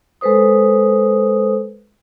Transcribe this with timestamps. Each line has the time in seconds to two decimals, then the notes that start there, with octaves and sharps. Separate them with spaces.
0.21 G#3 A4 B4 C5 D#6